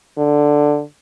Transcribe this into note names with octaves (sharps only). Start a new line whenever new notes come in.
D3